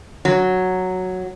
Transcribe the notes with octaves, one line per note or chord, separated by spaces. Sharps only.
F#3